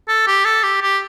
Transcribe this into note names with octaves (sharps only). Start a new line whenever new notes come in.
A4
G4
A4
G4
G4